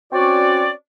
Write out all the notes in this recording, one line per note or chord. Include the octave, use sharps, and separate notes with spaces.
C4 C#4 F#4 C#5 D5